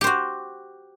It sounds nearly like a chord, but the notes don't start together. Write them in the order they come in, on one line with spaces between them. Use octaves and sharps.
G4 C5 F#4